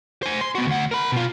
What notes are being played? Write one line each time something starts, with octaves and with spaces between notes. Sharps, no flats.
C5 G#5
C6
B3 F#4
D2 F#5
A#4 B5
B2 F4